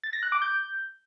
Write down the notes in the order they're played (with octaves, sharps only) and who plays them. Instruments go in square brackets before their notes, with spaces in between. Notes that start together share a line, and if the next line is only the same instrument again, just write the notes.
[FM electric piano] A6
A#6
F#6
D6
G6